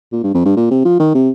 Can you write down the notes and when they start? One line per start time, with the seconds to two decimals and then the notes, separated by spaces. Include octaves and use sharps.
0.12 A#2
0.23 G2
0.34 F2
0.45 G2
0.56 A#2
0.71 C3
0.85 F3
1.00 D#3
1.14 C3